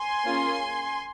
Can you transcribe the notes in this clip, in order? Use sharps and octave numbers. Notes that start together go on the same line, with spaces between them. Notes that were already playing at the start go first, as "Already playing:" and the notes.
Already playing: G#5 C6
A#3 C#4 F4 G#4